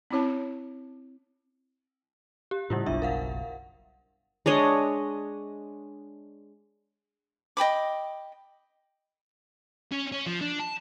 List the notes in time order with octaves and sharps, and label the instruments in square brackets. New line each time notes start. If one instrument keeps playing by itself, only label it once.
[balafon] C4 C#4 E4 C#5 A5
[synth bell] G4
[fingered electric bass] A2 C#3 [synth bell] G3 E4 F4
[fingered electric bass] F#1 B1 [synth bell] D4 F4 E5
[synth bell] A#4 F5 F#5
[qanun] G#3 D4 C#5 D#5
[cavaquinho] D#5 G5 B5 D6
[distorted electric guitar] C#4
C#4
F3
D4
A5